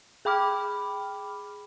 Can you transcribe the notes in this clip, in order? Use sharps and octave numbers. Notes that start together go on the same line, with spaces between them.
G#4 G5 B5 D6 F6